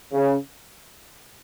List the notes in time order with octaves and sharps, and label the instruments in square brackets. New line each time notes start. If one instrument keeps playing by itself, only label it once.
[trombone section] C#3